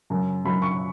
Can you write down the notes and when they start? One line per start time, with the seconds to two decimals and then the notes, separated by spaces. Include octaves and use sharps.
0.10 F#2 C#3 F#3
0.45 F#2 C#3 F#3 B5
0.62 C#6